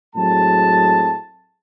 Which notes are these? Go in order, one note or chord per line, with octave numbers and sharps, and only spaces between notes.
A2 F#3 G#3 C4 G#4 A5